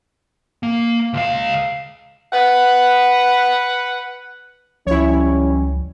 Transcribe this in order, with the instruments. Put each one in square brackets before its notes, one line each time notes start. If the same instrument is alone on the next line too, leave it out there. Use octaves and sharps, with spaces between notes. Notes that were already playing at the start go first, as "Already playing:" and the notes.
[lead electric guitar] A#3
C#2 F5
[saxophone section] B4 F#5
[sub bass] C#2 [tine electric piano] F3 [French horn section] G3 C#4 [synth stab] E4 C#5